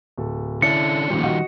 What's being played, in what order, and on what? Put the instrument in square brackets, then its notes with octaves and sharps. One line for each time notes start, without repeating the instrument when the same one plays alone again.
[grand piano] D1 A4
[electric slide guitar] D3 C#4 D4 [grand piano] E4 A6 [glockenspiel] C#7
[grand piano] A1 A#2 [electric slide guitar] D#3 F3 G3
[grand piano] F#4 D#5